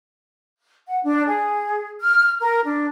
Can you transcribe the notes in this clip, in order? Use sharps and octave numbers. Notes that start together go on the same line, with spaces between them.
F#5
D4
G#4
F6
A#4
D4